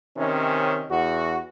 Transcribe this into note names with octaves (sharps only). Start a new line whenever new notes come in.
C3 D#3 C#4
E2 F#4